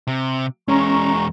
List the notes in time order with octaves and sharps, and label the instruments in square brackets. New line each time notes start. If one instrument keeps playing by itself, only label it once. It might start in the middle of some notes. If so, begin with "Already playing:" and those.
[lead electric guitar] C3
[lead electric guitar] E2 G#3 [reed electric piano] C#4 [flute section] A#5 C#6